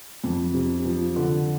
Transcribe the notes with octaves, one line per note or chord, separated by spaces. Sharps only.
F2
C3
F3
D3